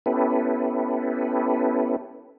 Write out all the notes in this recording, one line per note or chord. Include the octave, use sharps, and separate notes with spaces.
B3 C#4 E4 G4 A4 B4